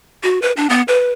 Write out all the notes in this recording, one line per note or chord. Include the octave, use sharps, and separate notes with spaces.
F#4
B4
D4
B3
B4